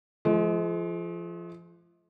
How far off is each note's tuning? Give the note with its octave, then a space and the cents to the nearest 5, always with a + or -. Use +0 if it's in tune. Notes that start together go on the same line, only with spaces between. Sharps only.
F3 -20 G#3 +40